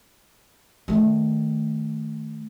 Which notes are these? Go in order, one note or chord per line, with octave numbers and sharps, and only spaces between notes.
D#3 A3